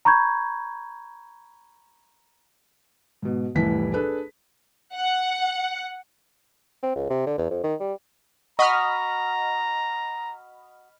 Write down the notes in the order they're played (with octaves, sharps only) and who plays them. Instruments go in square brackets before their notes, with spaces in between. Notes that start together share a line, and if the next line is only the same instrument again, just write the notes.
[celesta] A#5 B5 C#6 G6 G#6
[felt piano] G#2 B2
F1 C2 A2 E3 B6
D4 G#4 A4 B4
[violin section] F#5
[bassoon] C4
C#2
C3
D3
E2
F2
D#3
G3
[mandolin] F#4 [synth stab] D#5 B5 F6 [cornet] A#5 [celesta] C#6